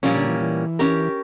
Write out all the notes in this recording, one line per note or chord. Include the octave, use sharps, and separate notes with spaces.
A#2 F3 G3 A#3 C#4
D3
E3
E3
C#4 G4 A#4